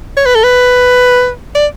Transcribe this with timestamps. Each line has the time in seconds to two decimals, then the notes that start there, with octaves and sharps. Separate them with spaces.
0.17 C#5
0.26 B4
0.35 A4
0.44 B4
1.55 D5